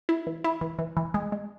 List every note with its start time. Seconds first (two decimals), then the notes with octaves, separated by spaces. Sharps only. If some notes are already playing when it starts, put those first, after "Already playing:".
0.09 E4
0.27 E3
0.44 E4
0.61 E3
0.79 E3
0.97 E3
1.14 G#3
1.32 G#3